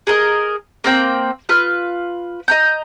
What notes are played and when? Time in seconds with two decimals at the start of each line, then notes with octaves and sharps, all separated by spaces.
0.07 G#4 A#4 B4 D#5
0.84 A#3 C4 G5
1.49 F4 B4 F6
2.48 D#5 A#5 G6